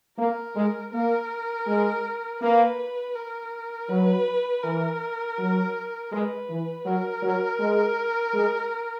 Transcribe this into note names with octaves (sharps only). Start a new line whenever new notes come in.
A#3 A#4
G#3
A#3 A#4
G#3
A#3 B4
A#4
F#3 B4
E3 A#4
F#3
G#3 B4
E3
F#3 A#4
F#3
G#3
G#3